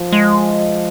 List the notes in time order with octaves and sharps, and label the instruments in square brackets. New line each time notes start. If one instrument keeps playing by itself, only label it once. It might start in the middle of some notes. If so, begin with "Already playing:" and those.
Already playing: [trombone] F3
[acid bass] G#3